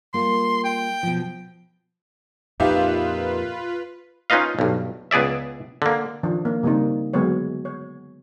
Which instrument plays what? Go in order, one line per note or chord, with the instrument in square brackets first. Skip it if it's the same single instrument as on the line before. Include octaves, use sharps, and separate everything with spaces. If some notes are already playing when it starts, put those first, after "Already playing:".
[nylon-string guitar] G3 A#3 F4 [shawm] C6
[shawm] G5
[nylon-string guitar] B2 F3
[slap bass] F2 A#2 [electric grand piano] D#4 E5 F5 [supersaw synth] F4 B4 [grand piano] G4
[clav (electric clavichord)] C#4 D#4 F4 B4 D#5 F5
B1 G2
C#2 B3 G#4 D5 E5
D3 A#3
[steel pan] D#3 F3 D4
A#3 D4
C#3 G3 A#3 C4 D#4
D3 F#3 G#3 B3 C#5
C#5